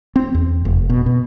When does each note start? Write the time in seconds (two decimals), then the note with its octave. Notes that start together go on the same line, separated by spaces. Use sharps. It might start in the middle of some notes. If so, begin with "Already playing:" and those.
0.16 C4
0.34 E2
0.65 F1
0.90 B2
1.06 B2